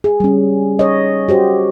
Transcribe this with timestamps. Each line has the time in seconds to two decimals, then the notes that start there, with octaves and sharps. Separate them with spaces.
0.04 G#4
0.20 G3 C#4
0.79 C#5 D#5
1.29 F#4 G4 C5